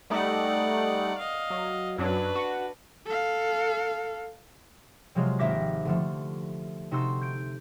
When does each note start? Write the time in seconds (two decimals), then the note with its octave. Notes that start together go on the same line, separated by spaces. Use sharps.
0.10 G3 A3 D#4 D5 F#5
1.18 D#5 F5
1.50 F#3
1.98 F#2 F#3 D4 B4
2.35 F#4
3.05 A4 F5
5.15 C3 F3 F#3 G#3 F4
5.39 G#1 A#3 G4 E5 D6 A#6
5.85 D3 F3 A3
6.91 C3 D#4 F#4 A4 C6 E6
7.21 G6 D7